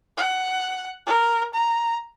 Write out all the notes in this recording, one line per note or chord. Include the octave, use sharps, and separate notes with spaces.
F#5
A#4
A#5